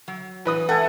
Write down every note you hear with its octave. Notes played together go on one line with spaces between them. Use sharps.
F#3
E3 B4 D#6
A3 A4 F#5 G#5